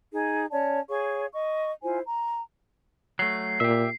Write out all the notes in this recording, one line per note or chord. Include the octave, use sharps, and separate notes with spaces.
D#4 G#4
C#4 C#5 D5 A5
G#4 C#5 F5 C#6
D#5 C#6
E4 F4 C5 G#5
A#5
F#3 A3 C7
A#2 G4 E5